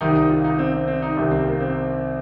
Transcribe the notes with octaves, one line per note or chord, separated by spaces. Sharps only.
C2 C3 D#3 D#4
D#4
F4
D#4
C4
C4
C4
D#4
C2 C3 D#3
C4
A#3
C4